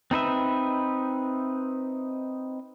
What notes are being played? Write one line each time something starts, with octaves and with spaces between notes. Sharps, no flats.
C4 D#4 B4 E5